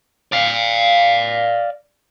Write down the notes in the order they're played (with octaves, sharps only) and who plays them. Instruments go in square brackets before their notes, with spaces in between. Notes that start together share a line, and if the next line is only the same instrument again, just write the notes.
[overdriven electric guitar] D5 F5